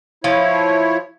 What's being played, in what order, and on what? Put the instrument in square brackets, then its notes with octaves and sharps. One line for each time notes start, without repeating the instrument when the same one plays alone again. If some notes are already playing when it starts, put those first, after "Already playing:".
[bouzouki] F3 [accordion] E4 C#5